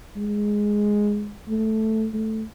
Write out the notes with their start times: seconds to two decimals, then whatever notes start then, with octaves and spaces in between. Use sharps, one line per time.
0.16 G#3
1.48 A3
2.13 A3